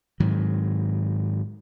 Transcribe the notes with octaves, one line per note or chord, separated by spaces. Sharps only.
G#2 D#3 F#3